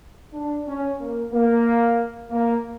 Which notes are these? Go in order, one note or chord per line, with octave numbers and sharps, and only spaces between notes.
D4
C#4
A#3
A#3
A#3